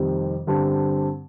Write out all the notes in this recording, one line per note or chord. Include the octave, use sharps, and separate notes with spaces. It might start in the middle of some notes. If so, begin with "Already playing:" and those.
Already playing: F2 C3 D#3 G3 C4
G2 D3 G3 C4